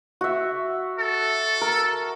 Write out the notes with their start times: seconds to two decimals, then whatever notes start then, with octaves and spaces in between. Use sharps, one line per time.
0.21 F#4 E5
0.99 A4
1.61 A#4